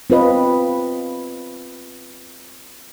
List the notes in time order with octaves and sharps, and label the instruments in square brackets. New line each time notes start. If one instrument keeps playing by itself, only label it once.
[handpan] C4 F4 B4 D#5